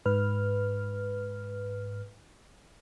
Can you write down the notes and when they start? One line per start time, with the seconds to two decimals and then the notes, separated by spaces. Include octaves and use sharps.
0.05 G#2 B4 F6